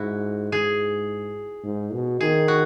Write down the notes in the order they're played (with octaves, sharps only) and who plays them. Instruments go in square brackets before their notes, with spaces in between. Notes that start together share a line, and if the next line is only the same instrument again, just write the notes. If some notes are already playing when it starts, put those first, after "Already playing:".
Already playing: [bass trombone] G#2 [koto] E4 F#4
[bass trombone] G#2 [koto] G#4
[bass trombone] G#2
B2
[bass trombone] D#3 [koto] G#4
[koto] F#4